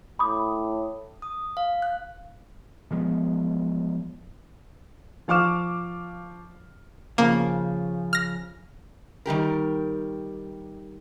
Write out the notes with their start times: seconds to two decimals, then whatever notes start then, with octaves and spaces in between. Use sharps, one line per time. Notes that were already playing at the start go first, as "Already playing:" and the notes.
0.19 A2 B5 D6 D#6
1.22 D#6
1.57 F5
1.82 F#6
2.91 E3 F3 G#3 B3
5.28 F3 F5 C#6 D6 F6 E7
7.18 C#3 F3 A#3
8.13 F6 A#6
9.26 D#3 G3 G4 A#4